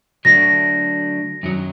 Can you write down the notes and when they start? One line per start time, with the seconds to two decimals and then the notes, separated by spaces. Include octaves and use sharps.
0.25 D3 F#3 A3 D4 F#4 A#6
1.43 F#2 D#3 F#3